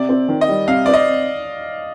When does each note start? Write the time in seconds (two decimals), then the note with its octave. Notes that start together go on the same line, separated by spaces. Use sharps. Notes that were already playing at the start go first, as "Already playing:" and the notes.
Already playing: C3 D5
0.09 C4
0.29 D#3
0.41 D#5
0.48 G3
0.68 C3 F5
0.86 C4 D5
0.94 D#5